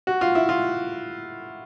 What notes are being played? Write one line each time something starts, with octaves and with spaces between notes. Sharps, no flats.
F#4
F4
E4
F4